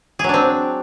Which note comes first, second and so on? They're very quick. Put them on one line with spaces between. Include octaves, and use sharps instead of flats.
G#4 F#3 D4 C4